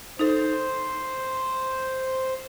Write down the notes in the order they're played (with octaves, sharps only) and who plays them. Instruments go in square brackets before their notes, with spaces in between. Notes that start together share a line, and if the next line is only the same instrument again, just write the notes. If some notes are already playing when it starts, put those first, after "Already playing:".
[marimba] D#4 A4 [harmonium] C5